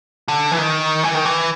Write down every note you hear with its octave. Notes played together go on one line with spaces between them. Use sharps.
D3
E3
D#3
E3
D#3
E3